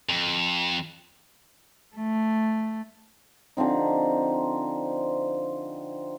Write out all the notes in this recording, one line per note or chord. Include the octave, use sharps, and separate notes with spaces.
F2
A3
D3 F3 C4 D#4